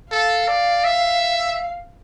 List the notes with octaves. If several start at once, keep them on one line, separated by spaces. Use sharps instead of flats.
A4 F5
D5
E5